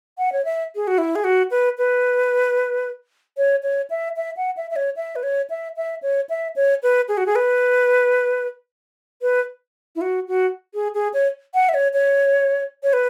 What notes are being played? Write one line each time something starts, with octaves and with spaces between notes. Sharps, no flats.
F#5
C#5
E5
G#4
F#4
E4
G#4
F#4
B4
B4
C#5
C#5
E5
E5
F#5
E5
E5
C#5
E5
B4
C#5
E5
E5
C#5
E5
C#5
B4
G#4
F#4
G#4
B4
B4
E4
F#4
F#4
G#4
G#4
C#5
F#5
E5
C#5
C#5
C#5
B4